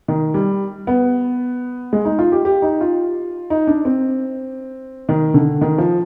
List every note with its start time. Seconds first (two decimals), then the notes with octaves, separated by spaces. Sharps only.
0.08 D#3
0.34 G3
0.87 B3
1.93 G#3
2.05 D#4
2.19 F4
2.32 G4
2.45 G4
2.62 D#4
2.81 F4
3.50 D#4
3.67 D4
3.85 C4
5.09 D#3
5.34 D3
5.61 D#3
5.78 F3